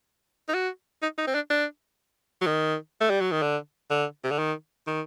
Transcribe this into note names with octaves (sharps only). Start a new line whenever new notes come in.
D#4
F#4
D#4
D#4
C4
D4
D4
F#3
D#3
A3
G3
F#3
D#3
D3
D3
C3
D3
D#3
D#3